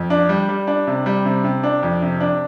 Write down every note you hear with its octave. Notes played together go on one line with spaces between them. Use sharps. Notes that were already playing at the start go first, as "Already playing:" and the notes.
Already playing: F2
D4
G3
G3
D4
C3
G3
C3
C3
D4
F2
C3
D4